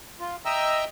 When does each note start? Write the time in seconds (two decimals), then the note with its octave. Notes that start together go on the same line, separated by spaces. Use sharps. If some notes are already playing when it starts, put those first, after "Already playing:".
0.20 F4
0.45 D#5 E5 G5 A#5 E6